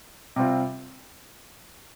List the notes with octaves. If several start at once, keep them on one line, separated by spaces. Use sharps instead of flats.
C3 G3 C4 F4